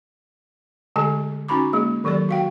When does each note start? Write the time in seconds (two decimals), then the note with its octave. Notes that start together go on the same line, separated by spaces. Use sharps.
0.96 D3 G#3 A3 G4 A4 G#5
1.48 C#4 D#4 F#4 A#5 B5 D6
1.73 G#3 A#3 G#4
2.04 D#3 F#3 G4 A4 D5
2.29 F#4 F5 G5